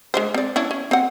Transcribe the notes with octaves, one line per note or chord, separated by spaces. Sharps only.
G#3 D4 C5
C4 D5
C#4 D4 E4
C#4
C4 F#5